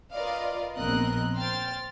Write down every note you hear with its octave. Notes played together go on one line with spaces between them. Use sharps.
F4 A#4 B4 D5 D#5 F5
A#1 B3 C4 A#4 D#5 F#6
C5 G5 F6 A6